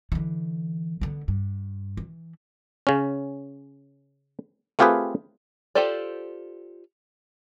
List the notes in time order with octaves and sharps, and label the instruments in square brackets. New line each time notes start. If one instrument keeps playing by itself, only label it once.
[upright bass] D3 E3
D3 B3
G2
E3
[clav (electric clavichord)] C#3 C#4
A3 C4 F4 G4 G#4 B4
[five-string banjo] F4 G4 A4 C5 D5